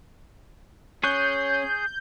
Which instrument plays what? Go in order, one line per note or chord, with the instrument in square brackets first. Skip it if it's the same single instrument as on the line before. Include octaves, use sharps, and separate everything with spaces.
[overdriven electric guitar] C#4 [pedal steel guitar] G#4 C#6 F#6 [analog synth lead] G6